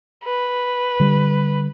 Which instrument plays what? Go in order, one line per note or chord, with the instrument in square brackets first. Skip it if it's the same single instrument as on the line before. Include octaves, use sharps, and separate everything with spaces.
[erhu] B4
[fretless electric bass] D3 G3